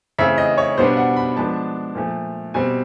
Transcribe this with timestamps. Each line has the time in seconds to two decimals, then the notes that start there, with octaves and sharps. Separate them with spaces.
0.18 C#3 E3 A3 C4 E5
0.38 D#5
0.58 C#5
0.78 B2 G3 B3 D4 C5
0.97 F#5
1.17 B5
1.36 F3 G#3 B3 D4 A5
1.95 A#2 F3 A3
2.54 B2 G3 C4 G#5